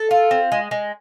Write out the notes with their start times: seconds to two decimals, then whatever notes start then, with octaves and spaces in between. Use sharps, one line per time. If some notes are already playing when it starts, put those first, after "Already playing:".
Already playing: A4
0.11 F4
0.31 C4
0.52 G#3
0.71 G#3